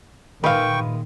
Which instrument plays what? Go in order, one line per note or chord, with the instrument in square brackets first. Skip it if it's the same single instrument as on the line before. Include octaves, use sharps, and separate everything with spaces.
[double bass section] A#2 D#3 [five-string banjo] G#3 E5 F5 [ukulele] B4 [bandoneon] G5 C#6